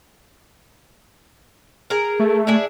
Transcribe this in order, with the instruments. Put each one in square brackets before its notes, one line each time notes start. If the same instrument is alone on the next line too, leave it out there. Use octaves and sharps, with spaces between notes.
[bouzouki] G#4 A#4
[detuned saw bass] A3
[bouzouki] D4 E4 G#4